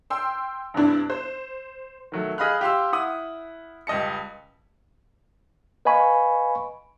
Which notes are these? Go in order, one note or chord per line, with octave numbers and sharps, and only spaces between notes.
G5 C6 E6
G2 C3 B3 D4 E4
C5
D#3 F#3 A3
G#4 D#5 F5 B5 F6 F#6
G4 F5 C6 E6
E4 F#5 D#6
C#2 G3 D#5 A5 C#7
B4 D#5 F5 G#5 B5 C#6